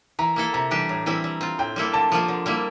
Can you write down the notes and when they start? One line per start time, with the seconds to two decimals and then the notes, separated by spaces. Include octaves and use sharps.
0.19 E3 A#5
0.36 A#3 E4 A4
0.54 C3 A#5
0.71 E3 G3 D4 G4
0.89 A2
1.06 E3 G3 C4 E4
1.24 G3
1.41 C4 F4
1.59 A2 G5
1.76 G3 A#3 E4 A4
1.93 D3 A5
2.12 F3 A#3 F4
2.28 D3
2.46 G3 A#3 E4